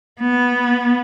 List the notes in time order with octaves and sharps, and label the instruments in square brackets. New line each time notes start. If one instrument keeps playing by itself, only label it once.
[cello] B3